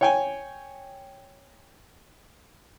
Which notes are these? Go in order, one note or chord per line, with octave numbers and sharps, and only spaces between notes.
C#5 G5 G#5